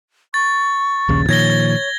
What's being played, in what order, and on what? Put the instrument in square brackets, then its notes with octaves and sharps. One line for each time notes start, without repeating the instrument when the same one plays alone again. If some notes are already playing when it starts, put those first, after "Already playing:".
[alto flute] C#6 [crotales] A6
[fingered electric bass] A#1 D#2 C#3
[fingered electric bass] A#2 D#3 F3 [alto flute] C#5 [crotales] G#6 A#6 G7